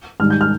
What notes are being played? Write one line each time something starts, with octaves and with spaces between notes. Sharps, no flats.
G#2 D#3 G3 F6
G6
F6